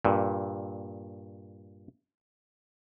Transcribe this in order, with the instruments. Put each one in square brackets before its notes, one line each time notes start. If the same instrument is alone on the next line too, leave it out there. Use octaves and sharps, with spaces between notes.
[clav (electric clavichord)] G2 A#2